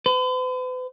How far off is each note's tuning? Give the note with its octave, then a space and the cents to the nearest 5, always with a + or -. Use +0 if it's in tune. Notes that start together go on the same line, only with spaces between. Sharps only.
B4 +45